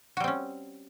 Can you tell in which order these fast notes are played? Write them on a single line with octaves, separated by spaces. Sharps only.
F#4 G3 C4 C#4